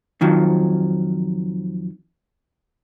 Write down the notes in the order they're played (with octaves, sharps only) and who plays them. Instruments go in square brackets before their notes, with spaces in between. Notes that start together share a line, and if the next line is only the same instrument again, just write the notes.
[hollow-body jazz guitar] F2 D#3 F3 F#3